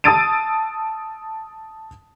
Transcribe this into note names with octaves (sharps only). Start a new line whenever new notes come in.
A5 D#6 E6 A6 D7 D#7